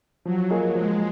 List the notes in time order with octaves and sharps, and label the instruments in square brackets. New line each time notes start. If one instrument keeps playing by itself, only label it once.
[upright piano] F3 [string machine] F#3
[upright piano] A#3 F4 G#4 D#5
[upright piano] F3 [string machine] G#3